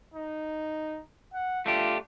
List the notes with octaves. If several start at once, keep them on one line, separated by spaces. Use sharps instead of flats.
D#4
F#5
A3 D4 F4 G4